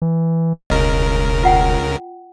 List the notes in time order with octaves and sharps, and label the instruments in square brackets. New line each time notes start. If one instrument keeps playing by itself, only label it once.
[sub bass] E3
[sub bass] E1 [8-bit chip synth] C#2 C#3 A#4 [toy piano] D#5
[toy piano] F4 F#5 G5